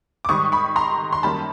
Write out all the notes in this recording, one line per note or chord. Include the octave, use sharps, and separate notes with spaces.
D6
G#2 D#3 G3 C#6 D#6
B5 C#6
A#5 C6
C6
F#2 D#3 G3 A#3 A5 B5